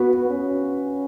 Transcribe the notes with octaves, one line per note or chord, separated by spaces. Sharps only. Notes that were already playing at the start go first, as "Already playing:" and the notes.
Already playing: B3 F#4 B4
C#4